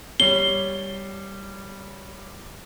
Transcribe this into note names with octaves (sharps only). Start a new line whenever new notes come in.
G3 C#5 C7 G7